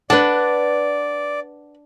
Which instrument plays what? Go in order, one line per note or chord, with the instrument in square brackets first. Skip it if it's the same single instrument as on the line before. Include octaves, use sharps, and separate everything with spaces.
[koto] D4 [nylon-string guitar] B4 F#5 [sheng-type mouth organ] D5